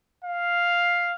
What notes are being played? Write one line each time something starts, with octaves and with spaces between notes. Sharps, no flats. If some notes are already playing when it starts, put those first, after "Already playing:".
F5